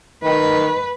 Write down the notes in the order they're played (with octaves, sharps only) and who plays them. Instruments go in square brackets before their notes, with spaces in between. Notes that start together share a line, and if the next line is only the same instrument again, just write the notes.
[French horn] D#3 [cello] B4